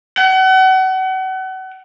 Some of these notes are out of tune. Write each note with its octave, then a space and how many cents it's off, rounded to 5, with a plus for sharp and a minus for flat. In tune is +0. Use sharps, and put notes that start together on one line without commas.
F#5 +35